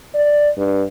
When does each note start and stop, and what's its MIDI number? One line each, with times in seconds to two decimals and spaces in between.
0.14 0.49 74
0.57 0.83 43